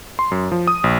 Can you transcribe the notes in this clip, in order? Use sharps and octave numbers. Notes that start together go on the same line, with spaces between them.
C6
F#2
F3
D#6
A#1